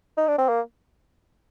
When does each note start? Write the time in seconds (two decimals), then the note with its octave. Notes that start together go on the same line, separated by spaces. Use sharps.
0.17 D#4
0.28 D4
0.38 C4
0.48 A#3